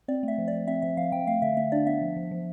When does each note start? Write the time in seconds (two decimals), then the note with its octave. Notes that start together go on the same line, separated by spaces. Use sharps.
0.08 C4 D5
0.23 A3 E5
0.38 F3
0.48 D5
0.53 F3
0.67 C4 E5
0.82 F3 E5
0.97 F3 F5
1.12 F3 G5
1.27 A3 F5
1.42 D3 E5
1.57 A3 E5
1.72 D4 D5
1.87 B3 E5
2.02 F3
2.17 F3
2.31 F3